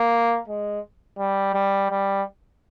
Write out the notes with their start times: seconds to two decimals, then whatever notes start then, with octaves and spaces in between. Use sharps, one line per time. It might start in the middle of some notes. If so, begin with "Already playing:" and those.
Already playing: A#3
0.48 G#3
1.18 G3
1.54 G3
1.90 G3